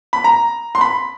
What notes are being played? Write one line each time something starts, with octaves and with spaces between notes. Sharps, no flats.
B5
A#5
C6
B5